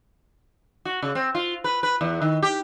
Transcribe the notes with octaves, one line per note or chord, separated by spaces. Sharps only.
F#4
C#3
C4
F4
B4
B4
E2
D#3
G4